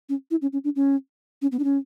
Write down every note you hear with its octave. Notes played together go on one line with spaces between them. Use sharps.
C#4
E4
C#4
C#4
D4
C#4
C#4
B3
D4
C#4